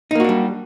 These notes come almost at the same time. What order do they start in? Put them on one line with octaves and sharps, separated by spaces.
D#4 A#3 F#4 D4 G3